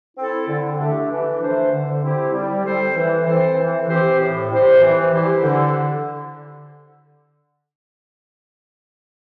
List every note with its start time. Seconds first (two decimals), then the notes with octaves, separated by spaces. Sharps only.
0.17 C4 E4 A4
0.48 D3
0.79 A3 D4 G4
1.10 E3
1.40 A3 D4 C5
1.71 D3
2.02 C4 E4 G4
2.33 G3
2.63 C4 A4 C5
2.95 E3
3.25 C4 A4 C5
3.57 E3
3.88 C4 G4 C5
4.18 A2
4.49 G3 C4 G4 C5
4.80 E3
5.11 G3 E4 G4 C5
5.43 D3